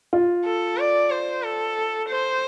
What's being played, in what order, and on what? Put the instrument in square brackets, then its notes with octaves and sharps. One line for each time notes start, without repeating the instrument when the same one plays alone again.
[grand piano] F4
[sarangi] A4
D5
C5
A4
C5